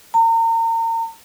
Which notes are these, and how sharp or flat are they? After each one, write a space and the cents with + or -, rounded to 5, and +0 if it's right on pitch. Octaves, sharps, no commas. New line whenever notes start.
A#5 -35